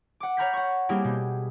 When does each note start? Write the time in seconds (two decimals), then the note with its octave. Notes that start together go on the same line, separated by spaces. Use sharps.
0.20 F#5 D6
0.37 C#5 A#5 B5 F6 G6 B6
0.53 F#5 C#6
0.89 G3 A#3 C4 E4 G4 G#4
1.04 B2